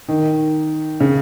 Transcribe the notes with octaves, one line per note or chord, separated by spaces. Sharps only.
D#3
C#3